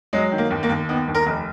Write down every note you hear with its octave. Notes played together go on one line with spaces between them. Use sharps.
F#3 G#3
D#3
A#3
D#2
A#3
D#2
D#3 B3
D#2
A#4
F1